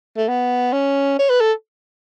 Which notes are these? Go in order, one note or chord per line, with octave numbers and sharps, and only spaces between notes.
A3
B3
C#4
C#5
B4
A4